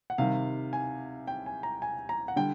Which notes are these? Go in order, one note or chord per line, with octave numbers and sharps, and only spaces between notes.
F#5
C3 D#3 G3 F5
G#5
G5
G#5
A#5
G#5
A#5
F#5
D3 G3 G5